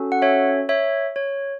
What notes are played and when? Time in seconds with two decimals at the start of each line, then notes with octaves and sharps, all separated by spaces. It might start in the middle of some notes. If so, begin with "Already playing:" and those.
Already playing: C#4 F#4 A4
0.12 F#5
0.22 C#5 E5
0.69 C#5 E5
1.16 C#5